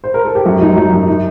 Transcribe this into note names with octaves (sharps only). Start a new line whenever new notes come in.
C5
A#4
A4
G4
F#2 F#4
F#3 D#4
F#3 D#4
F#2
D#4